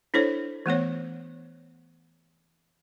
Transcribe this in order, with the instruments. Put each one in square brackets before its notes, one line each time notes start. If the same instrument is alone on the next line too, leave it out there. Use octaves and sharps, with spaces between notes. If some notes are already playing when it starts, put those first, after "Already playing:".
[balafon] D4 E4 A4 C5 C#5
E3 A3 B3 C#5